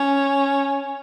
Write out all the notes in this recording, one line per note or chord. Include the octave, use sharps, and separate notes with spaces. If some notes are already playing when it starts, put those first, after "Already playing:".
Already playing: C#4